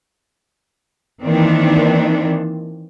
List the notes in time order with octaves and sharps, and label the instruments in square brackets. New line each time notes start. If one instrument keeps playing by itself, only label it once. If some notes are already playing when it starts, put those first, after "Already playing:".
[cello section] D#3 E3 A#3 C4 D4